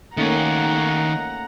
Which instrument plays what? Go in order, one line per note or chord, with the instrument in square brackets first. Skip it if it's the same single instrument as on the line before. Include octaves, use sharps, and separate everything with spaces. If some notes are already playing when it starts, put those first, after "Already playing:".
[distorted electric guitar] D#3 C#5 [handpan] A3 A#3 C#4 [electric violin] F#5 A#5